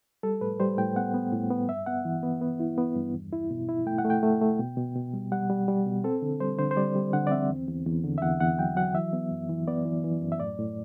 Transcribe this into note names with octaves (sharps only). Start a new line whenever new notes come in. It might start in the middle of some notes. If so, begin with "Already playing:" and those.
G3 A4
A2 B4
G3 C5
A2 G5
B3 F#5
B3
A2
B3
G2 E5
B3 F#5
E3
B3
B3
E4
B3
G2
E2
E4
B2
E4
A3 G5
F#5
A3
G5
A3
A3
B2
B2
B2
G3
G3 F#5
G3
G3
B2
C4 A4
D3
G3 C5
D3 C5
C5
G3 D5
G3
D3 F#5
D5
C4 E5
E2
E2
E2
D3
E5
E2 F#5
E2 F#5
F#3 G5
F#3 F#5
E3 E5
B3
F#2
E3
B3 D5
E3
E3
F#2
E5
A2 D5
A2